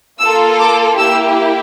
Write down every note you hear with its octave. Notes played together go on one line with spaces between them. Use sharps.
A#3 F4 A4 E6
D6
A#3 E4 G4 E6